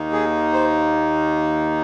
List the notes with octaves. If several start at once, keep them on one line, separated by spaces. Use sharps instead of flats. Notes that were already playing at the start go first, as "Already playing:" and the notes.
Already playing: D#2 D#3 A#3 D#4
G#4
C5